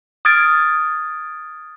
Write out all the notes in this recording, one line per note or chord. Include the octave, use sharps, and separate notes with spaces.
D#6 F6 G#6 A6 D7